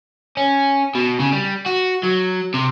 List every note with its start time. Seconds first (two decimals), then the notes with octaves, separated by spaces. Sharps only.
0.37 C#4
0.95 B2
1.20 C#3
1.32 G3
1.66 F#4
2.04 F#3
2.54 C3